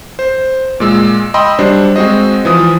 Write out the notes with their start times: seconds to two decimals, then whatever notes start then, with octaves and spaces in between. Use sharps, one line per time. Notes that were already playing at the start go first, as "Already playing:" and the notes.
0.19 C5
0.80 A#2 G#3 E6
1.34 D#5 G5 B5 C6 E6
1.59 F#3 G3 D4 C5
1.96 G#3 C4 F#4 C5 D#5
2.45 E3 F3 D#6